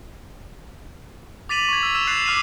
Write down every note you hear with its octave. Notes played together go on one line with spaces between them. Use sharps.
D6 A6 B6 D#7 F7 F#7
C#6 G#6
E6
E6 E7 F7
E6 F#6 A6 C7
C#6 D6 F6 B6 D#7